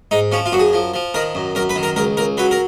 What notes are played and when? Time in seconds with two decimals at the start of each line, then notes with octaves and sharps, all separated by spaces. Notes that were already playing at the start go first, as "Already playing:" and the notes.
0.11 G#2 D#4
0.32 F3 C#4
0.46 F4
0.52 F#2 F#4
0.59 G#4
0.73 F3
0.94 F3
1.14 D#3 A#4
1.35 F#2
1.55 F#2 A#4
1.69 B4
1.76 D#3
1.83 A#4
1.96 C#2 A#4
2.17 C#2 A#4
2.37 F#3 B4
2.51 A#4